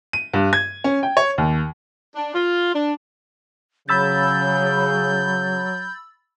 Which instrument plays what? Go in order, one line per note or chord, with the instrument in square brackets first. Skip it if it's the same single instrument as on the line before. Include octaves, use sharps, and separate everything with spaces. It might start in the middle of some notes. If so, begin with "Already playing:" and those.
[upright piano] D#7
G2
G#6
C#4
G5
C#5
D#2
[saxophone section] D4
F4
D4
[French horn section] C#3 [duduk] F#3 [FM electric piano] B5 E6 A6 [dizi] G6